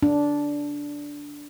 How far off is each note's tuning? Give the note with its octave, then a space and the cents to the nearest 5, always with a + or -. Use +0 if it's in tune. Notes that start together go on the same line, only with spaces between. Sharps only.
D4 -10